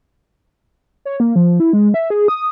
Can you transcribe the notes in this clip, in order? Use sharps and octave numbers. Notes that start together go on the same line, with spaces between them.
C#5
A#3
F3
E4
G#3
E5
G#4
D#6